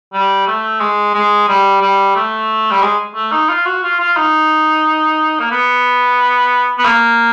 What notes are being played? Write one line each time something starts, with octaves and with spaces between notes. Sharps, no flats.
G3
A3
G#3
G#3
G3
G3
A3
G3
G#3
A3
D#4
F4
F#4
F4
F4
D#4
A#3
B3
B3
A#3